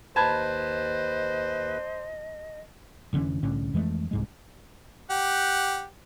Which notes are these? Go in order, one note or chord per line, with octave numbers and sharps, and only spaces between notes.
D#2 B4 C5 D#5 A5 B5 G#6
F1 D3 E3 C#4
C2 A2 D3 C#4
F2 E3 G#3 A3
C2 G#2 G#3
G4 F#5